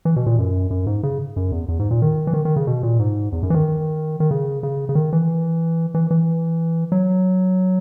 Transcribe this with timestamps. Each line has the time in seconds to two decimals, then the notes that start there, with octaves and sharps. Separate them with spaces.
0.05 E3
0.16 B2
0.26 A#2
0.38 F#2
0.71 F#2
0.87 G#2
1.03 C#3
1.36 F#2
1.52 E2
1.69 E2
1.79 G#2
1.91 A#2
2.02 D#3
2.27 E3
2.34 D#3
2.45 D#3
2.56 C#3
2.67 B2
2.83 A#2
3.00 G#2
3.32 E2
3.43 F#2
3.50 E3
3.54 D#3
4.20 D#3
4.31 C#3
4.63 C#3
4.89 C#3
4.95 D#3
5.13 E3
5.94 E3
6.11 E3
6.92 F#3